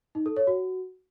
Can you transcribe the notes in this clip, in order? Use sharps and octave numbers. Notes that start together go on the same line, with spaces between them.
D#4
A4
C#5
F#4